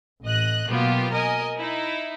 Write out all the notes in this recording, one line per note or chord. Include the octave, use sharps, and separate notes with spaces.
A1 D#5 F#6
B2 F#3 A#3 B3 F4 G4
A#4 D#5 G#5
D#4 E4